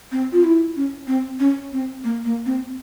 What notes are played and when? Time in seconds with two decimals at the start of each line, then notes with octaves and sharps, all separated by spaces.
0.12 C4
0.32 F4
0.44 E4
0.76 C#4
1.07 C4
1.40 C#4
1.72 C4
2.04 A#3
2.25 A#3
2.46 C4